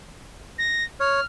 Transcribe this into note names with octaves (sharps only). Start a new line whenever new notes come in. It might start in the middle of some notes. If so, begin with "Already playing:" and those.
A#6
C#5 F6